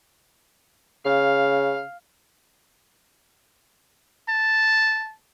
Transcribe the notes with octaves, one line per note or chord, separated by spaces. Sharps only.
C#3 F5
A5